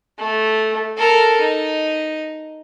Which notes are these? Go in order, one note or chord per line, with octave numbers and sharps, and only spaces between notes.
A3
A4 A#4
D#4